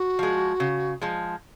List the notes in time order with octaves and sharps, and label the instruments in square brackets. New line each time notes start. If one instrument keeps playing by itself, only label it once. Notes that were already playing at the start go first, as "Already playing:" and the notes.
Already playing: [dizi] F#4
[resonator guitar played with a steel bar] F3 G#3
C#3
F3 G#3